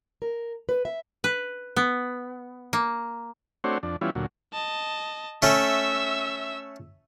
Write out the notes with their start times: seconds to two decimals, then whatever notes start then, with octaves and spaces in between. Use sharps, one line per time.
0.22 A#4
0.69 B4
0.85 E5
1.24 B4
1.76 B3
2.73 A#3
3.64 A3 C4 D4 F#4 C5 C#5
3.83 F2 D4
4.01 E3 G3 B3 C#4 E4 F4
4.15 D2 A#2 F#3
4.53 D#5 A5
5.42 A3 C#4 E5 E6